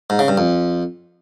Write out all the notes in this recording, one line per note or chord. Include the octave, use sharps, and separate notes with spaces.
G#2
C#3
G2
F2